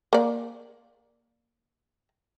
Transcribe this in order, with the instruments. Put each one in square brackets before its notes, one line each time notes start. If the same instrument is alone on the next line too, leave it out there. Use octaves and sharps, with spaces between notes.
[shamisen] A#3 D5